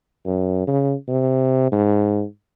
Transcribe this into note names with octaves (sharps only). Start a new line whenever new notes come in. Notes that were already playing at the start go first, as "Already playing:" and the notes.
F#2
C#3
C3
G#2